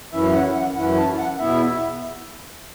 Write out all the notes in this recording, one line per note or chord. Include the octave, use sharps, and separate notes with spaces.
F#2 E3 C#4 E4 E5
F#5
F#5
F#2 E3 C#4 E4 F#5
A5
F#5
E2 B2 B3 E4 E5